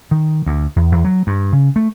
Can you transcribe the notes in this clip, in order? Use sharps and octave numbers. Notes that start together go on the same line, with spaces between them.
D#3
D2
E2
E2
F#3
G2
C#3
A3